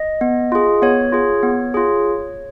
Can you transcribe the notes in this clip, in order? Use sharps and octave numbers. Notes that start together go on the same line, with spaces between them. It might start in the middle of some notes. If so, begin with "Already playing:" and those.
Already playing: D#5
B3
F4 G#4
B3 C#5
F4 G#4
B3
F4 G#4